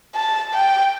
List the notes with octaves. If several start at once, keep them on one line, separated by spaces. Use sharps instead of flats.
A5
G5